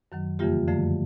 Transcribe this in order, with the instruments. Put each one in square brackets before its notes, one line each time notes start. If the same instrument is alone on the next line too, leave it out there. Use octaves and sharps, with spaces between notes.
[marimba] F#2 D#3 F#3
F2 C#3 E3 G3 A#3 F4 G4
F#2 D3 F3 A3